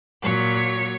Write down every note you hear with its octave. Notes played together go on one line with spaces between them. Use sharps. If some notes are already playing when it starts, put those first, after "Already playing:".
A#2 F#3 C#5